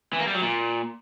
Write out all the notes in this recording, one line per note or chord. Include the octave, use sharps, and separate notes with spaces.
E3
A#3
G3
F#3
A#2